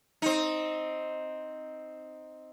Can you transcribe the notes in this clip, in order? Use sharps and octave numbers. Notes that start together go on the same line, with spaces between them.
C4 D#4